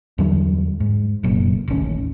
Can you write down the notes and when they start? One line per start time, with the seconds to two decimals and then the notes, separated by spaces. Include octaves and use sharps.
0.18 E2 D3 F#3 G3
0.80 G#2
1.23 F1 F#2 A#2
1.68 D#1 A1 D#2 C#4